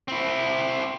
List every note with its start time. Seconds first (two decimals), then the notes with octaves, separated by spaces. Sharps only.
0.08 C4 E4